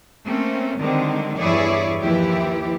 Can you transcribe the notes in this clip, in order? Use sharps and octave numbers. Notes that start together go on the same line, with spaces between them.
A3 A#3 C4 C#4
D3 D#3 G3 G#3 C4
E2 G2 E4 G#4 C#5 D5
D#2 E3 F3 E4 G4